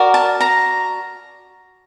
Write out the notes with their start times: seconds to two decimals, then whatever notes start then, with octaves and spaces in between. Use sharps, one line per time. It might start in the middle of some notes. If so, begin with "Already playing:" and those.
Already playing: F#4 A#4 D5
0.14 A5
0.41 A#5